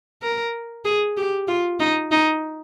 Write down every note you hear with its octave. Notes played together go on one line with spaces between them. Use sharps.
A#4
G#4
G4
F4
D#4
D#4